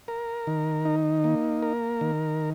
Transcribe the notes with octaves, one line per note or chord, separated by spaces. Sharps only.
A#4
D#3
D#4
A#3
A#4
D#3